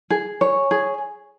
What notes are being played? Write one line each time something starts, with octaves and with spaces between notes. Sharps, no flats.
G#4
C#5
G#4